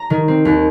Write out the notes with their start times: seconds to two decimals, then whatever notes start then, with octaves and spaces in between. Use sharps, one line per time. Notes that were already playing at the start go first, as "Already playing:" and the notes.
Already playing: A#5
0.10 D#3
0.28 C4
0.45 D#2